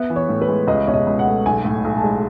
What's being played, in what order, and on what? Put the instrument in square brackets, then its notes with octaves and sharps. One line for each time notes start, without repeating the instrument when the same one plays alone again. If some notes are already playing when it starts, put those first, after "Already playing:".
Already playing: [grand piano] B3 [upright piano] E5
[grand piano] E3
[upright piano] C#5
[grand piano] A2
[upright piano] B4
[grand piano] G#3
[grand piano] C#2 [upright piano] D#5
[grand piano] B2 [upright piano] C#5
[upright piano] D#5
[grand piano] C#2
[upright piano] F#5
[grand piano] A3
[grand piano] B1 [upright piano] G#5
[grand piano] A2
B1
[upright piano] A5
[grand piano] G#3